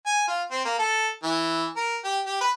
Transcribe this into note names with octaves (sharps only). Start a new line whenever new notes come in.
G#5
F4
C4
A#3
A4
E3
A#4
G4
G4
B4